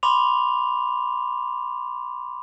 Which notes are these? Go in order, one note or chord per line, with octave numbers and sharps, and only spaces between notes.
B5 C6 D6 F7